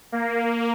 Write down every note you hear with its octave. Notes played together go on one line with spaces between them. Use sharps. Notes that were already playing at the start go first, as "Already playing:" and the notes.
A#3